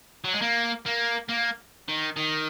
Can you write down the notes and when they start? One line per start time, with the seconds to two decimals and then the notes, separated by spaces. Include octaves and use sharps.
0.25 F#3
0.34 G#3
0.42 A#3
0.86 A#3
1.29 A#3
1.88 D#3
2.16 D#3